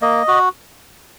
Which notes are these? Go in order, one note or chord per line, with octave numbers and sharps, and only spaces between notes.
A#3 D#5
F#4